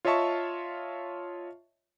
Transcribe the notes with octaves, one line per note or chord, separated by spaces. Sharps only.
F4 C#5 D#5 E5 A5 C#6